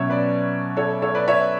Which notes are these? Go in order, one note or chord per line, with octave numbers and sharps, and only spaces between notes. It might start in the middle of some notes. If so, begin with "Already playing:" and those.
Already playing: B2 F#3 C#4 C#5 E5
B4 D5
A4 C#5
A4 C#5
B4 D5
C#5 E5